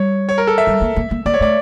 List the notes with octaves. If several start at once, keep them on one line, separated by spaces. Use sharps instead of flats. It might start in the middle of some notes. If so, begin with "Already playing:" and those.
Already playing: G3 C#5
C#5
A#4
A4
E5
G3
A#3
A#3
A#3
A#3 D5
C#5
A3 D5